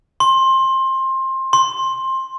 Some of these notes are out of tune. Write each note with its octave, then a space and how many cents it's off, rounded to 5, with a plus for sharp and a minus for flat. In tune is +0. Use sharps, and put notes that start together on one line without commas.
C6 +20
C6 +15